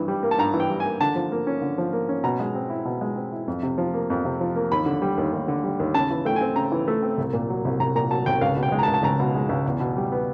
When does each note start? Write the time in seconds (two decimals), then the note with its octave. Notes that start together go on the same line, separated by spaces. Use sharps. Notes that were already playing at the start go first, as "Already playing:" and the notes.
Already playing: G2 E3
0.08 G3
0.23 A#3
0.31 A5
0.38 G2 A#5
0.54 E3
0.60 G5
0.70 G3
0.80 A#3 G#5
1.01 D3 A5
1.16 F3
1.32 A#3
1.47 C#4
1.62 D3
1.78 F3
1.93 A#3
2.09 C#4
2.23 B2 A#5
2.40 G#3
2.55 C4
2.70 E4
2.85 B2
3.01 G#3
3.16 C4
3.32 E4
3.48 F2
3.63 C3
3.78 F3
3.94 A#3
4.10 F2
4.25 C3
4.40 F3
4.55 A#3
4.72 D#2 B5
4.86 D3
5.02 G3
5.18 D#2
5.33 D#2
5.48 D3
5.64 G3
5.80 D#2
5.94 C#3 A5
6.11 E3
6.25 A3 G5
6.36 C4 G#5
6.56 C#3 A#5
6.72 E3
6.88 A3
7.03 C4
7.18 C2
7.33 A#2
7.50 F#3
7.65 C2
7.80 C2 A#5
7.95 A#2 A#5
8.11 F#3 A5
8.26 C2 G5
8.41 C#2 F5
8.57 B2
8.63 G5
8.72 G#3
8.79 A#5
8.83 A5
8.88 C#2
8.94 A5
9.03 C#2 A#5
9.20 B2
9.35 G#3
9.49 C#2
9.66 E2
9.80 B2
9.97 G3
10.12 B3